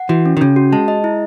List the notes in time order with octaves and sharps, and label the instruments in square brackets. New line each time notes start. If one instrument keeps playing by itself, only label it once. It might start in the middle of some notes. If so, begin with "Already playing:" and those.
Already playing: [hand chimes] F#5
[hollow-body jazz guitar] E3 [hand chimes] F#4
[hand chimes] C#4
[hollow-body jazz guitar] D#3
[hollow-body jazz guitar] C#3 [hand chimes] C#4
[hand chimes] F#4
[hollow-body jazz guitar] G#3 [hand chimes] A5
[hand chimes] D#5
E4